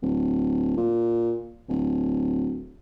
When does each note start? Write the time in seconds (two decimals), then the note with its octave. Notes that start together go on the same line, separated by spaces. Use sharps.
0.02 D1
0.77 A#2
1.69 D1